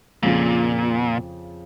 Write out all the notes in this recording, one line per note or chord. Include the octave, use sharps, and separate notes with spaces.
F2 A#2 C#3 F3